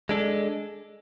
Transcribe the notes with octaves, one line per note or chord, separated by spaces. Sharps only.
G#3 D4 A4